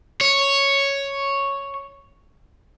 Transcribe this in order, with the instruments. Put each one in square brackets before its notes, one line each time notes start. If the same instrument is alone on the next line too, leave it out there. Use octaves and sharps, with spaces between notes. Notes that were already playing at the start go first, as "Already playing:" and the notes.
[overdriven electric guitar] C#5